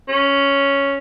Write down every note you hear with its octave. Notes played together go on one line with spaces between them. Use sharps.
C#4